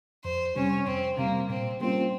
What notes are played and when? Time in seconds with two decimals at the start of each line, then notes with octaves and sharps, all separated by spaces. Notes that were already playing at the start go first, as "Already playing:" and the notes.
0.24 F2 C5
0.56 C3 G3 C4 C#4
0.87 F2 C4
1.18 C3 G3 A#3 C4
1.50 A#2 C4
1.80 G3 A#3 C4 C#4 F4